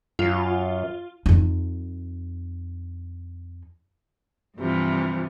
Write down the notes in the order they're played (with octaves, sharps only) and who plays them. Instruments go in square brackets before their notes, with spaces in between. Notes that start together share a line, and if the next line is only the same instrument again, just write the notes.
[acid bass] F#2 [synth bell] F4
[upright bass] F2 D#4
[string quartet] G2 C3 E3 F3